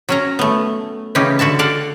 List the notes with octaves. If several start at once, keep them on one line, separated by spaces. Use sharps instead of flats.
F#3 C#4 A#5
A3 B3
C#3 E3 C#4 D#4 G4
D3 F#4 E5 A5
A4 D5 F5 F#5